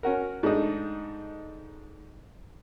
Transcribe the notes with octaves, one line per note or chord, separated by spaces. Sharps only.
C#4 F#4 A#4
G#2 A3 D4 D#4